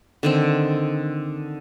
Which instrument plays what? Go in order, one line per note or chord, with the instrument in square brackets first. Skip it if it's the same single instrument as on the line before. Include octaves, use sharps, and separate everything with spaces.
[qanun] D3 D#3 C4